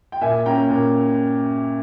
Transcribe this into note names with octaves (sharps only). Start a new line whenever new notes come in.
G5
A#2 E5 G#5
A#3 C#4 G5 A#5
A#2